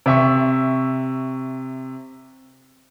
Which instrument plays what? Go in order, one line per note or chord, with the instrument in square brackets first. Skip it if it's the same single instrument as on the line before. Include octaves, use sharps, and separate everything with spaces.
[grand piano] C3 E5 C#6